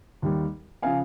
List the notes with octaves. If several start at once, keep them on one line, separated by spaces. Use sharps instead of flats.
D#2 D#3 G3
C#3 F3 F5 G#5